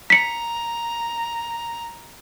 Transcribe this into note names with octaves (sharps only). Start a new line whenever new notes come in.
A#5 B6 C#7